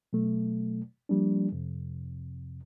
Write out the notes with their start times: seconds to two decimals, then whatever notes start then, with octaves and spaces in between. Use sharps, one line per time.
0.13 B2 F#3 A3
1.09 F3 G3 A#3 D4
1.52 F2 C3